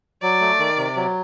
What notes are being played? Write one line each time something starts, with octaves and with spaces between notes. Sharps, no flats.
F#3 D5
A3
D#3
C3
F#3